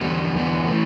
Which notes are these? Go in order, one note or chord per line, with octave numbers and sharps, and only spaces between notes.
E2 D3 G3 B3
E2 D3 G3 B3
E3 A3